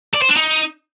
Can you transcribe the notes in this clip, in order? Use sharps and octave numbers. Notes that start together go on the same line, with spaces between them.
D5
C5
D4
D#4